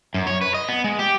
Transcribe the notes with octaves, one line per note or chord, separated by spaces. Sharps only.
F#2
C#5
B4
D#5
B3
G#3
G4